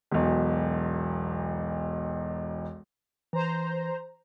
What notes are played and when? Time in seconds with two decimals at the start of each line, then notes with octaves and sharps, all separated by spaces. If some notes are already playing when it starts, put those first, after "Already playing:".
0.11 E1 B1
3.33 E3 C5 A#5